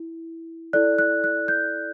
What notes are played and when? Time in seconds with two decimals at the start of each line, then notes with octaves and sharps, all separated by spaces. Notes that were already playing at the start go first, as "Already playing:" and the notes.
Already playing: E4
0.73 E4 A4 D5 F#6
0.99 F#6
1.24 F#6
1.48 G6